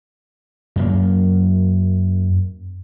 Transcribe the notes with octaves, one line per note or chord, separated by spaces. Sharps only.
F#2 A#3